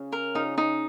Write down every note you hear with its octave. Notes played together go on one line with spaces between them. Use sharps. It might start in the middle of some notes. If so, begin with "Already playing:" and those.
Already playing: C#3
A#4
C#3 D#4
D#4